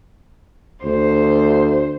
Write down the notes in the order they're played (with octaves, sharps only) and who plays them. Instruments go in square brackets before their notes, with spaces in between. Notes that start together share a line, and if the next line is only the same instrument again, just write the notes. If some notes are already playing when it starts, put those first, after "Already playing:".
[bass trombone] D2 [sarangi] C5